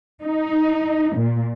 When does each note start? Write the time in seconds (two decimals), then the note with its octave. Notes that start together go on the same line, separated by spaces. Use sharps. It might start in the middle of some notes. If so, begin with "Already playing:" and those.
0.23 D#4
1.17 A#2